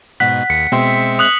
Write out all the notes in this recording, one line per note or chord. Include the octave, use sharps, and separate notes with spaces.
G#2 B2 F#5 F#6 B6
D#2 C#7
B2 G#3 C4 E5 G5 C6
D#6 F#6 F#7